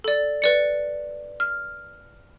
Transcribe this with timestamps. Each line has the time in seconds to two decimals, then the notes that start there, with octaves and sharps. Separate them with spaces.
0.04 A4 D5
0.42 B4 D5 C#7
1.40 F6